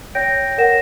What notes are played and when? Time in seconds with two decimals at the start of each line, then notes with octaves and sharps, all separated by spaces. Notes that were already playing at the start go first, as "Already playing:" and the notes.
0.15 C#5 G5 G6 A#6 D7
0.58 A#4 C#5 F#5 A#6 E7